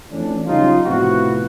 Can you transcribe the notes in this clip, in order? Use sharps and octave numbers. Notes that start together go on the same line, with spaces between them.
F2 E3 A3 C#4 D4
C#3 F#3 G3 C#4 D#4 F4
A2 C3 F3 B3 E4 F#4